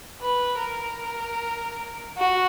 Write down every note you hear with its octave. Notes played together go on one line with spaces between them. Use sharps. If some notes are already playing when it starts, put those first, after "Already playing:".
B4
A#4
F#4